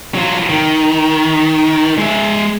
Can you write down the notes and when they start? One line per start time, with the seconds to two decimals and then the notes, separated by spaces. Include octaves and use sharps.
0.15 F#3 F4
0.50 D#3
1.98 G#3 E5